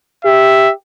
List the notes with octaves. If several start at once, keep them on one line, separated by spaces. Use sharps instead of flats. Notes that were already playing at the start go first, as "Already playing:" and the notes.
G4 E5